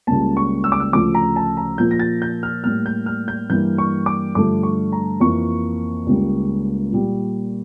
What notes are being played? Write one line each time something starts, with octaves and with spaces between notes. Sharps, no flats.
C#2 C#3 G3 A#3 A5
C#6
E6
D6
E6
D2 C#3 F3 A3 D6
A#5
A5
A#5
A#2 F3 A#3 G6
A#6
A6
G6
F6
A2 G3 A#3 F6
G6
F6
G6
G2 E3 G3 A#3 G6
C#6
D6
G2 D3 F3 A3 D6
C#6
A#5
F2 E3 A#3 C#6
C#2 C#3 G3 A#3
A#2 G3 A#3